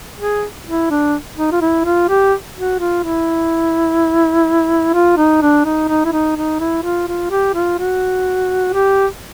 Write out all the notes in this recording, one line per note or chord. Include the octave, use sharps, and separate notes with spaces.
G#4
E4
D4
D#4
F4
E4
F4
G4
F#4
F4
E4
F4
D#4
D4
D#4
D#4
E4
D#4
D#4
E4
F4
F4
G4
F4
F#4
G4